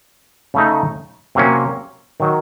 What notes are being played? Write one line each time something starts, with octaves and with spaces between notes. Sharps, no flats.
C#3 A3 D#4
C3 F#3 A#3 C#4
D#3 F#3